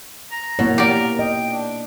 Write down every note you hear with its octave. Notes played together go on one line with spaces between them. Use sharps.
A#5
B2 A#3 E4 C#5
G4 A#4 D5
D#5 G5
D4